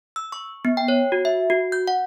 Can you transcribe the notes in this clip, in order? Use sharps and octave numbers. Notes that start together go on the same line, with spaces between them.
E6
C#6
B3
G5
C#5
F#4
E5
F#4
G6
F#5